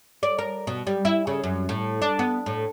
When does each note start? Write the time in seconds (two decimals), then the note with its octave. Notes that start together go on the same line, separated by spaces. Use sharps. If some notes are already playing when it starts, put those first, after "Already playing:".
0.23 D5
0.39 A#4
0.67 B2
0.87 G3
1.05 E4
1.27 C#3
1.44 F#2
1.69 A2
2.02 D4
2.19 B3
2.46 A2